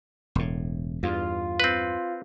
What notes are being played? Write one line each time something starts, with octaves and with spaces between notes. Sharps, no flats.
E1 A2
E2 G2 F4
C4 B4